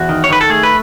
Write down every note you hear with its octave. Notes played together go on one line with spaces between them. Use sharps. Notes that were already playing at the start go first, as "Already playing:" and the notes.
Already playing: E2 F#4
D#3
C#5
D#3 B4
A4
A3 G#4
B4